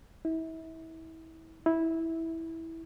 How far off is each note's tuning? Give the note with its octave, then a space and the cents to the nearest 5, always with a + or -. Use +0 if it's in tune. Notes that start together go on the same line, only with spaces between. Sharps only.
E4 -30
E4 -10